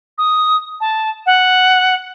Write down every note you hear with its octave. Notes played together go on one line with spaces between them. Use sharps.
D#6
A5
F#5